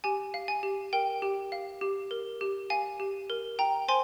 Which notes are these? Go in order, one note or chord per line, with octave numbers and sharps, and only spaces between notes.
G4 G#5
F5
G#5
G4
A#4 G5
G4
F5
G4
A#4
G4
F5 G#5
G4
A#4
G5 A#5
C5 G#5 C6